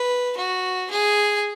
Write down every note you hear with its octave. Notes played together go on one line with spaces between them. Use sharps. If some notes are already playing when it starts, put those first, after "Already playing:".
Already playing: B4
F#4
G#4